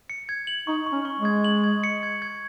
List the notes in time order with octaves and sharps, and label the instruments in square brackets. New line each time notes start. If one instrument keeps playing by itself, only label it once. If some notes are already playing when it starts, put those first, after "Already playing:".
[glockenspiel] C#7
G#6
F#7
[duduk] D#4 [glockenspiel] C#6
[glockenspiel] C#6
[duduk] C#4
[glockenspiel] C#6
[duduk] G#3
[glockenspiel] G#6
F#7
G#6
C#7
G#6
G#6